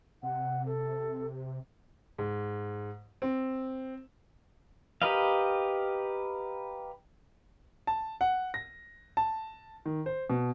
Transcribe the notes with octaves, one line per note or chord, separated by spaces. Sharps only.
C3 F#5
A4
G#2
C4
G4 A#4 B4 D#5 F5
A5
F#5
A#6
A5
D#3
C5
B2